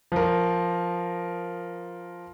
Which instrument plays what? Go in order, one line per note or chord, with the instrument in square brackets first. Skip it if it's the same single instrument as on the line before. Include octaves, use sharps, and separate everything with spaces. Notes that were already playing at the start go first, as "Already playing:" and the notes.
[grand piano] F3 A#4